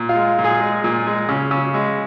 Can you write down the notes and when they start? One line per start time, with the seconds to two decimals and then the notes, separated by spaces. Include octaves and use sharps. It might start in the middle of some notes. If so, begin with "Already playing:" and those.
Already playing: A#2
0.09 F4
0.15 G#3
0.39 A#2
0.44 G#4
0.60 G#3
0.84 A#2
1.07 G#3
1.29 C#3
1.51 C#3
1.74 G#3